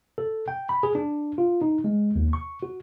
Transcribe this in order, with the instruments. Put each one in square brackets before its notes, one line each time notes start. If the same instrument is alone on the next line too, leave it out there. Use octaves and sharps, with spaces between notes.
[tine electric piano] A4
G5
B5
G#4
D4
F4
D#4
G#3
D#2
C#6
F#4